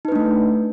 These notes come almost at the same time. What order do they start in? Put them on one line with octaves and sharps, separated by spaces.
D#4 B4 D4 A3